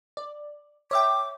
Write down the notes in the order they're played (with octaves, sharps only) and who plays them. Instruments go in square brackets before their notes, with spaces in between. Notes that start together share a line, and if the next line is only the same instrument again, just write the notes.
[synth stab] D5
[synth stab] C#5 E5 G5 [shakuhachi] D6